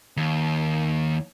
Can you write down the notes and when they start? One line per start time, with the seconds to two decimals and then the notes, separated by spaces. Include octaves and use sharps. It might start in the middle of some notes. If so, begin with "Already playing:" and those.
0.17 D#2